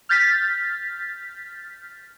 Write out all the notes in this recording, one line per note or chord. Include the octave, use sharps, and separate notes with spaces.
F6 G6 A6 B6